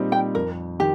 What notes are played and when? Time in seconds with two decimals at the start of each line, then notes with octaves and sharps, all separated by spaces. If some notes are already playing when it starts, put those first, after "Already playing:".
Already playing: A#2 G3 C4 D#4
0.12 G5
0.35 F2 A#4
0.80 D#3 G4